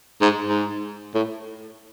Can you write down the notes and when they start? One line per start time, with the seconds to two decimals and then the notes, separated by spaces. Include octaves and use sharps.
0.22 G#2
0.45 G#2
1.15 A2